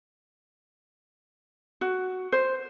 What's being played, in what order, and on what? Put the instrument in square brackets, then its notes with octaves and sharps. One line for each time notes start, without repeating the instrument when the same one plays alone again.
[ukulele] F#4
C5